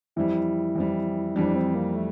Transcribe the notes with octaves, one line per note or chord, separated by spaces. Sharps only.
F2 E3 G3 E4
F2 E3 G3
F2 E3 G3 D4
C4
A#3
A3